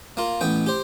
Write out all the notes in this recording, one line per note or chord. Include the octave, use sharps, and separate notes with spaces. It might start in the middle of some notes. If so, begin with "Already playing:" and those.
A#3 F4
A1 B3 G5
G4 C5